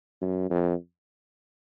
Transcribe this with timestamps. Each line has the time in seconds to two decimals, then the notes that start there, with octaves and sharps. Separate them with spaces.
0.21 F#2
0.50 F2